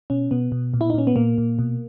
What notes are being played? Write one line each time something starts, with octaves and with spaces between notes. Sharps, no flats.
B2 C#4
B2 B3
B2
A#2
E4
D#4
A#2 C#4
B3
A#2 A#3
A#2
B2